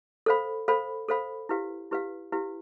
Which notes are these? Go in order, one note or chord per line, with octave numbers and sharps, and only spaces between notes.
A4 C5 F5 B5
A4 C5 F5 B5
A4 C5 F5 B5
E4 G4 B4 F5
E4 G4 B4 F5
E4 G4 B4 F5